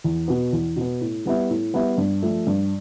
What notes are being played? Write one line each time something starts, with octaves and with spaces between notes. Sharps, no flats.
E2
B2 B3
E2
B2 B3
A2
G3 B3 E4
A2
G3 B3 E4
G2
F3 A3
G2